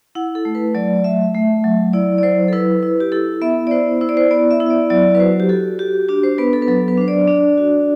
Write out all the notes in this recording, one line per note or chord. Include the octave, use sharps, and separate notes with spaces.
E4 F#5
A4
A3
B4
F#3 D5
A3 E5
A3
F#3
E4 D5
D5
F#3 C5
A4
E4 B4
E4
G4
E4 A4
B3 E5
D5
E4 C5
E4 C5
D5
C5
B3 D5
E5
E4
E5
D5
F#3 D5
B4
F#4 C5
G4
F#4 A4
F#4 G4
D4 G4
C5
B3 B4
A4
B4
F#3 A4
B4
D4 C5
D5
D4
F#4